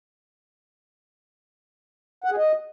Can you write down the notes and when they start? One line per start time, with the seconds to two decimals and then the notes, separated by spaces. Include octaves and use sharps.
2.24 F#5
2.31 G#4
2.37 D#5